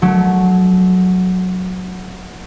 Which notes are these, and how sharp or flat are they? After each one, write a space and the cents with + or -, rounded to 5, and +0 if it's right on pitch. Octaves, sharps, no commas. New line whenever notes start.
F#3 -10 A3 -30 D4 +0